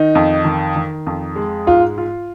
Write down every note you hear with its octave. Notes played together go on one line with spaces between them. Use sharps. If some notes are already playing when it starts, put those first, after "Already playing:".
Already playing: D#3 D#4
F2
D#3
D#3
F2
G#3
G#2 F4
F4